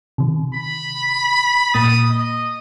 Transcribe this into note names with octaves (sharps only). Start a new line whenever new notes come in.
C3 D#3
B5
A#2 A#3 D#6 A6
D#5